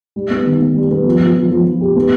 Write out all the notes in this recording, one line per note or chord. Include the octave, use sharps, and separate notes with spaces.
G3
B3
D#3
B3
G3
B3
F3
F3
F3
F3
F3
G4
B3